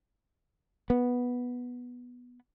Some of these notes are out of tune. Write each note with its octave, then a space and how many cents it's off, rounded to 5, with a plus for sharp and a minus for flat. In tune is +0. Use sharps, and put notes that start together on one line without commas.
B3 -5